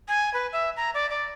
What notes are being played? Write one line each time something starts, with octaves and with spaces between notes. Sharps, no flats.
G#5
B4
E5
A#5
D5
D5